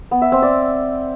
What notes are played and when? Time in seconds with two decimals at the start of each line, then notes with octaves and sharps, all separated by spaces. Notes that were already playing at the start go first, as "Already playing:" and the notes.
0.11 B3
0.22 E5
0.32 C4
0.42 D5